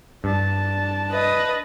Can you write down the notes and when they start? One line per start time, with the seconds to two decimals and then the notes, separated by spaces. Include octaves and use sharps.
0.24 G2 D4 A5
1.11 B4 D#5